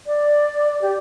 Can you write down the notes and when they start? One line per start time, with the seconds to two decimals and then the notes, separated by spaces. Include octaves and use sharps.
0.07 D5
0.82 G4